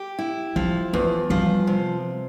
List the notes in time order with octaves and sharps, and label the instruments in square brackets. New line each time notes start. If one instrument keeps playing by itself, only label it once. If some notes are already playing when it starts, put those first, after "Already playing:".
Already playing: [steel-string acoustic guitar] G4
E4
[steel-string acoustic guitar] F3 [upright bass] G3
[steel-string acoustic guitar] E2 [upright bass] A3
[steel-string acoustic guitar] F3 [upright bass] G3
[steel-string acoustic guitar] C3